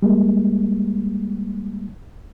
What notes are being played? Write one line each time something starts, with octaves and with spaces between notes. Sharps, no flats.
G3 G#3 A#3